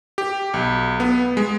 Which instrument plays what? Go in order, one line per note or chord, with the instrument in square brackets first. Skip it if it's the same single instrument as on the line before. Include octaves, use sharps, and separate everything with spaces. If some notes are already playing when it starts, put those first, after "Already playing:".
[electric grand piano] G4
B1
B3
G#3